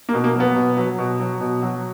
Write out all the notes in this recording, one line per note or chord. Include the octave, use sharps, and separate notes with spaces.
A#3
B2
A#3
F#3
B3
B2
F#3
B2
F#3
B2
F#3